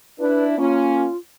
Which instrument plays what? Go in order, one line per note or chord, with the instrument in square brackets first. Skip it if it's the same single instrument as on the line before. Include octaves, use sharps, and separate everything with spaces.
[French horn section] D4 E4 [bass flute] B4
[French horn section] A#3 C#4 [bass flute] F4